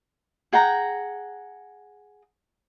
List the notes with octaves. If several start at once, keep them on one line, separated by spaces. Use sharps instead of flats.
G#4 F#5 G5 A#5